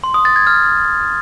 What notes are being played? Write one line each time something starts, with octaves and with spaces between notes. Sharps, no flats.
C6
D#6
A6
G#6
F6